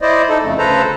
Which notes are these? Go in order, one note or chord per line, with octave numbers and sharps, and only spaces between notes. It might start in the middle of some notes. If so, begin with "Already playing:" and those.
E4 C5 D5 D#5
D#4 A4
F2 C#3 A3
D2 C#3 A4 B4 C5 A#5